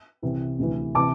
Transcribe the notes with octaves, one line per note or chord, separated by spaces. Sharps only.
C2 C3 E3
D2 C3 E3
C3 E3 A5 D6